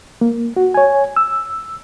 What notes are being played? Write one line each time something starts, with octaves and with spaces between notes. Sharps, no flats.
A#3
F#4
C#5 G#5
E6